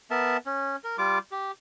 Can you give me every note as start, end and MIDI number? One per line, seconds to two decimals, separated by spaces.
0.11 0.37 59
0.11 0.37 70
0.11 0.37 76
0.11 0.37 81
0.46 0.76 61
0.84 0.96 70
0.98 1.19 55
0.98 1.19 65
0.98 1.19 86
1.32 1.51 67